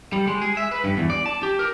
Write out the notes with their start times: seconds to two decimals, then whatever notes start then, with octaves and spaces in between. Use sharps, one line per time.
0.13 G3
0.27 G#3
0.41 G#4
0.57 E5
0.71 B4
0.84 G2
0.97 E2
1.10 D5
1.26 A5
1.43 G4
1.59 A#4